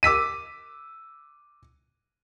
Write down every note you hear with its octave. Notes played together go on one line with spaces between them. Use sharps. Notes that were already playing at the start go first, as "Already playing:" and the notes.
D6 E6 B6 D#7